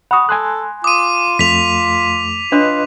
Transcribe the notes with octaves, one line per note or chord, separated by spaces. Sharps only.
F#5 B5 C#6 D#6
A4 G#5 C6 F#6
F4 D6 D#6 D#7
F2 A3 F4 B6 F7
D4 F4 B4 C#5 D#5 F#6